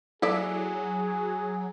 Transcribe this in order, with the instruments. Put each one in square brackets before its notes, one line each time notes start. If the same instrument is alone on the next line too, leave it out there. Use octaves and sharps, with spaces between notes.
[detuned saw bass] F#3 [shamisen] A#3 A4 D5 [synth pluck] E4 [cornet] G#4